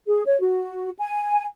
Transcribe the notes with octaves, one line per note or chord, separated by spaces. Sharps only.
G#4
C#5
F#4
G#5